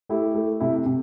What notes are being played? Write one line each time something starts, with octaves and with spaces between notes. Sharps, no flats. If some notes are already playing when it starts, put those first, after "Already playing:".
A3 E4 G4
A3
C3 E4
C3